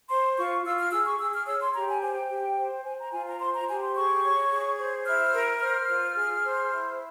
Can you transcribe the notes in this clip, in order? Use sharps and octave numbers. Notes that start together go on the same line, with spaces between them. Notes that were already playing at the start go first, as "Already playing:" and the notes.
C5 C6
F4 C#6
F4 E6
F6
G#4 E6
C#6
G#4 E6
F6
C#5 E6
C6
G4 A#5
G#5
C5 G#5
G5
G4
C5
C5 G#5
A#5
F4 G#5
A#5
C5 C6
A#5
G4 G#5
C6
G#4 C#6
C#5
G#4
C5
E4 F6
A#4
C5 F6
F4
G#4
C5
E4